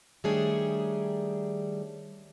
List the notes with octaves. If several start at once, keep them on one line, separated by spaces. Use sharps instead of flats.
D#3 G3 A3 D4 G#4 C#5